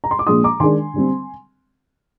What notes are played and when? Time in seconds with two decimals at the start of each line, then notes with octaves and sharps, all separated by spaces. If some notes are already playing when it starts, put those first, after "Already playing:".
0.04 A#5
0.11 C6
0.19 D6
0.27 A#2 F3 G#3 D4 C6 D#6
0.44 A#5 D6
0.60 D#3 G#3 D4 G#5 C6
0.94 D3 G3 C4